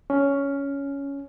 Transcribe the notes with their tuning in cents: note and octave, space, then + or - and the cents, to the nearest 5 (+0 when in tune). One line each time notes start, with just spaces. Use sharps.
C#4 +10